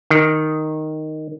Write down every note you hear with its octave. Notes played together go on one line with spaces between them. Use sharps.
D#3